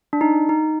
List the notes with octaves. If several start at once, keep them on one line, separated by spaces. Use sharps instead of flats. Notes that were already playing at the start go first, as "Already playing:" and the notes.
D4
D#4
D#4